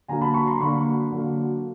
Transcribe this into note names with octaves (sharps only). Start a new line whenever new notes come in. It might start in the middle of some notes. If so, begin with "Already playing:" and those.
D3 F#3 A#3 G#5 A#5
A5 B5
B5 C#6
A#5 C6
D3 F#3 A#3 B5 C#6
D3 F#3 A#3